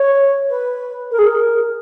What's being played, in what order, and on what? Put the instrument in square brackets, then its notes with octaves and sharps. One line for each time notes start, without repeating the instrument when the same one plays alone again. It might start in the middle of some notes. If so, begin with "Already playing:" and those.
Already playing: [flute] C#5
B4
A#4
G#4
A#4